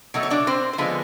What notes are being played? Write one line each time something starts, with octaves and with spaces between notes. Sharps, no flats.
B2 F#3 A3
C#5
D4 D5
C4 C5
C5
D3 F3 G#3 B3 B4